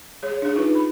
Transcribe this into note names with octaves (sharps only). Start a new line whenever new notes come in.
G#4 C#5
D4 G#4
D#4 F4 B4
B5